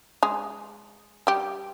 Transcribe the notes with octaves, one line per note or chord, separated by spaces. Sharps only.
G#3 G#4
G3 G4